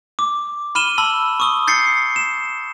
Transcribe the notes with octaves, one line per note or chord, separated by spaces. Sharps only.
D6
B5 F6 D#7 E7 G7
A5 B5 E6
C#6 D#6 G7
G6 A6 C7 C#7
E7